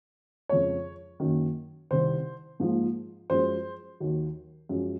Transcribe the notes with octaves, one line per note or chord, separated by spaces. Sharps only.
F2 C#3 G#3 C#5
F#2 D#3 A#3
C2 C3 D#3 C5
G#2 F3 A#3
F#2 F3 G#3 C5
D#2 D#3 F#3
F#2 F3 G#3